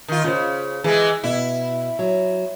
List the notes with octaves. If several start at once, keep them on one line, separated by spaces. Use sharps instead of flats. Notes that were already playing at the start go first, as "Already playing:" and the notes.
D#3 F4
C#3 F4 C5
E3 G#3 G#4
B2 E4
F#3